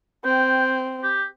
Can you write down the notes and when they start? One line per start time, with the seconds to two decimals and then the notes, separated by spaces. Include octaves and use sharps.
0.25 C4 G5
1.03 G4